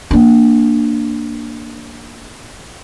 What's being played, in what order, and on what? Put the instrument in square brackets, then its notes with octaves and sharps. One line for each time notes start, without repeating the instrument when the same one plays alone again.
[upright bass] A#3 D4